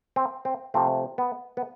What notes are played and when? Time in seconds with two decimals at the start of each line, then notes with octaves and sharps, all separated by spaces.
0.16 C4
0.45 C4
0.74 C3 F3 A3 C4
1.18 B3
1.57 B3